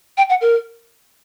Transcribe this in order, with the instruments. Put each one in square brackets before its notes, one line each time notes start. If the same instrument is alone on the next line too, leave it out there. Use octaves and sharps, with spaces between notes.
[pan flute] G5
F#5
A#4